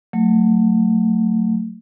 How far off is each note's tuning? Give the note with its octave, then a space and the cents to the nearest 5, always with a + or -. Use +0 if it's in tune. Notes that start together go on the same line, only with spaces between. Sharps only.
F#3 +0 A3 +30